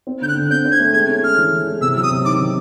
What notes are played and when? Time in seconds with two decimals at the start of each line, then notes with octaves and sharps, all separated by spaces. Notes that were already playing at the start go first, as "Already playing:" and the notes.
0.07 C4
0.21 D3 G6
0.28 F#6
0.35 D3
0.50 C4 G6
0.65 C4
0.72 G#6
0.80 A3
0.94 G#3 G#6
1.08 C#4
1.23 G#3 F6
1.37 E3
1.53 E3
1.67 G#3
1.81 C3 E6
1.96 F#3 E6
2.03 D#6
2.10 C3
2.25 D#3 D6
2.40 D#3